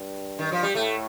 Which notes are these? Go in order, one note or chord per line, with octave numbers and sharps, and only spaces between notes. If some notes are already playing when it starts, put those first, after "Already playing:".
Already playing: G2
D#3
F3
G3
A2 A3